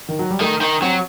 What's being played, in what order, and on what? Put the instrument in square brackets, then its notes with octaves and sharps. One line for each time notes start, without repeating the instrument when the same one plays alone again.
[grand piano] D#3
F#3
G3
[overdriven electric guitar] D#3 [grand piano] A3
[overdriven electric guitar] D#3
[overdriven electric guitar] F#3 [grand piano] C4